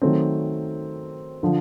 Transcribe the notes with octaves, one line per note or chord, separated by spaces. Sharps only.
D#3 F#3 A3 C4
D3 F3